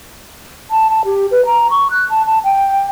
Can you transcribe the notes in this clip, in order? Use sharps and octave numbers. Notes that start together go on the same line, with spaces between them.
A5
A5
G4
B4
A#5
C#6
F#6
A5
A5
G5